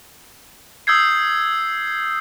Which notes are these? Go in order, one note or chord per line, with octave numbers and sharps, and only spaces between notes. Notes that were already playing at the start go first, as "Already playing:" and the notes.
D#6 E6 G6 G#6 C7